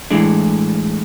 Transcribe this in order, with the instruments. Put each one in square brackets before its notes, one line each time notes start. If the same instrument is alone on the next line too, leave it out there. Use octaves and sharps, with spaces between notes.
[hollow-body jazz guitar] A2 E3 G#3 D4